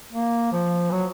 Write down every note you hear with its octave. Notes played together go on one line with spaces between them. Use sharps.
A#3
F3
F#3